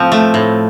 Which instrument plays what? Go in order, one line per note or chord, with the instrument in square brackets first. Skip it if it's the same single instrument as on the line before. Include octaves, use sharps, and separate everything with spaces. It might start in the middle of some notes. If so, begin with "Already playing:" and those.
Already playing: [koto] A2 F3 C4
A3
A2